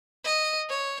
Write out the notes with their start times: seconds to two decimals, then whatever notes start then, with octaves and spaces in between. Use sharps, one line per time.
0.24 D#5
0.69 C#5